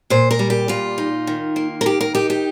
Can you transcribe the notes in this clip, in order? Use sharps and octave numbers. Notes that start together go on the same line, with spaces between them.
A#2 C5
A#4
G3
G4
A#2 F4
D#4
D#3
A#3
A#4
D#3 G4
A#4
D#4 G4
G4